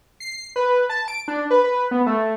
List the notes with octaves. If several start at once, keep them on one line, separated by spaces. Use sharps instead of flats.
C7
B4
A5
D7
D4
B4
B4
B3
A3